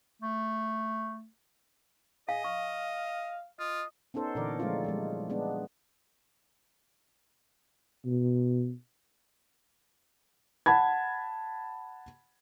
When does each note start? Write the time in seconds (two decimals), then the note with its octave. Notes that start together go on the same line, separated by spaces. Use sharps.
0.22 A3
2.29 G#4 D#5 F5
2.44 F5 C#6
3.59 F4 D#5
4.14 B3 C#4 D#4 A4 C5
4.35 A#2 D3 E3 A#4 D5
4.59 F3 G#3 A3 C4 D4 F4
4.84 F3 G3 G#3
5.30 G#3 B3 D4
8.05 B2
10.66 F#5 A5 B5 G#6